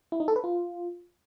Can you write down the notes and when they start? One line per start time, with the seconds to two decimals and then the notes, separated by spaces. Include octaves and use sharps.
0.12 E4
0.20 D#4
0.28 A4
0.36 B4
0.44 F4